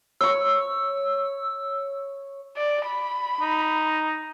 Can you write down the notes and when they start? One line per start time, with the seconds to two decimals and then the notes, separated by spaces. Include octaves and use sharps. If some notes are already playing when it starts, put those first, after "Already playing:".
0.21 C#5 C#6 E6
2.56 D5
2.86 B5
3.41 D#4